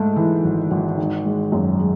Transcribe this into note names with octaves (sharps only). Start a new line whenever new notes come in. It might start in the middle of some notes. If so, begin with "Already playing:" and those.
Already playing: G#2 A3
E3
G#1
G#1
D#3
G#3
F#2
G#3